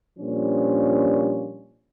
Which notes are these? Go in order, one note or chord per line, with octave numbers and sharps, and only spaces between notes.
A#2 F3 G3 C#4 D4